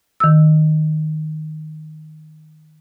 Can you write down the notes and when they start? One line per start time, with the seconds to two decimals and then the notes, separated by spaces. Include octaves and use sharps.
0.20 D#3 E6